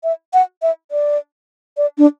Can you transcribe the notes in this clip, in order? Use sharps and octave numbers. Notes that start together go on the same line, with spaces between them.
E5
F#5
E5
D5
D5
D4